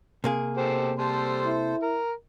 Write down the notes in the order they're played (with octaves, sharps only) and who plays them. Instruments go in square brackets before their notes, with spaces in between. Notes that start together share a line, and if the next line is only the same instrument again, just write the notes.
[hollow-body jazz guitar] C3 A#3 G#4
[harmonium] B2 [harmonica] G4 A4 C5
[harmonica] G3 C6 [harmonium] A4 C5
[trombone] E4
[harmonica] A#4